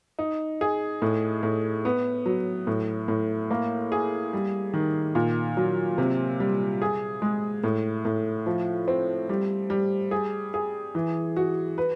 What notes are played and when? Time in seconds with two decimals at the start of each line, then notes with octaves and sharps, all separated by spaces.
0.19 D#4
0.61 G#4
1.02 A2
1.43 A2
1.85 B3
2.26 F#3
2.67 A2
3.08 A2
3.51 A#3
3.92 G#4
4.33 G3
4.74 D#3
5.15 A#2
5.57 F#3
5.98 C3
6.40 G3
6.82 G#4
7.22 G#3
7.63 A2
8.05 A2
8.46 F3
8.88 C4
9.29 G3
9.70 G3
10.11 G#4
10.54 G#4
10.95 E3
11.37 F#4
11.78 B4